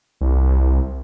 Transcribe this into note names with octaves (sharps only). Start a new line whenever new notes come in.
C2